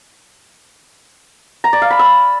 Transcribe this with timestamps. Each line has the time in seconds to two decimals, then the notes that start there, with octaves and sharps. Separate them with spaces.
1.64 A#5
1.73 D5
1.82 F5
1.90 B5
1.99 E6